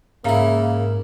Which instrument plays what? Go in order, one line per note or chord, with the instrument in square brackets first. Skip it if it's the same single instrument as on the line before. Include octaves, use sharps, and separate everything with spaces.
[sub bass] G#2 [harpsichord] C#3 E4 [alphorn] A#3 [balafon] E5 F5 A#5